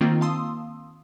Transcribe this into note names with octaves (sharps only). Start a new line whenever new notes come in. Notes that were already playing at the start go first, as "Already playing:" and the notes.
D#3 A#3 C4 F4
F5 A5 C6 D#6 E6